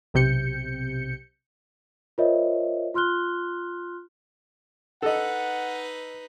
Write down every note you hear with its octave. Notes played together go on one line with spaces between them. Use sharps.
B1 C3 G6 C#7
F4 A#4 C5 C#5 D#5 E5
F4 C6 F6 F#6 G7
D#4 A4 B4 D#5 F#5